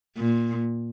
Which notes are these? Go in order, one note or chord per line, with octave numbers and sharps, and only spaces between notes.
A#2